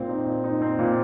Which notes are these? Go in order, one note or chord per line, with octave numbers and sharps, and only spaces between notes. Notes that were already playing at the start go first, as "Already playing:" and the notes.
Already playing: A#2 C4
D#4
A#2
D#4
C4
A#2